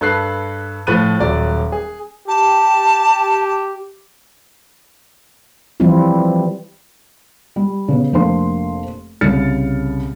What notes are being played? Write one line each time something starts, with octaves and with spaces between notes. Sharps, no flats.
G2 A4 B4 F#6 C7
A2 F3 B5 F#6 D#7
D#1 F#3 D5
G#4
G4 A5
E3 F3 G3 C4 E4 F4
G3
C#3 B3
F1 A#3 D4 C5 C6
C2 C#3 F6 A6 C#7